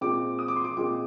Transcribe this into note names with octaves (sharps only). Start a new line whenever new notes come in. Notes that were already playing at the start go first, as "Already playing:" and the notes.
A#2 G#3 C4 D6
D#6
D6
C6
D6
A#2 G#3 C4 D6